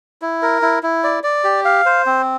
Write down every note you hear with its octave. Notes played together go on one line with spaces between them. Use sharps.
E4
A#4
E4
E4
D5
D5
G4
F5
C5
C4